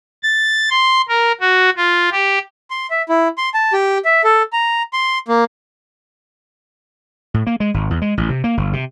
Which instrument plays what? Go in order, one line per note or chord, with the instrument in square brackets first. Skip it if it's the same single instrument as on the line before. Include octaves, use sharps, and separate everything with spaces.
[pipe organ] A6
C6
A#4
F#4
F4
G4
[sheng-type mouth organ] C6
E5
E4
C6
A5
G4
E5
A4
A#5
C6
A#3
[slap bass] A2
A#3
G#3
G#1
E2
G#3
A1
C3
A#3
G1
C3